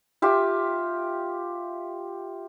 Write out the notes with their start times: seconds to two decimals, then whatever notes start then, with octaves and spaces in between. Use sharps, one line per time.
0.22 F4 G4 E5